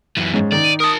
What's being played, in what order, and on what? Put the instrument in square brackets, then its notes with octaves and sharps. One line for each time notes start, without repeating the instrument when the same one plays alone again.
[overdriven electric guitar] F#2 E3
[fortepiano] G#2 C#4
[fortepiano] D#3 [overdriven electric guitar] D5
[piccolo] D#7
[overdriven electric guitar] A#4 A5 [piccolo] D#6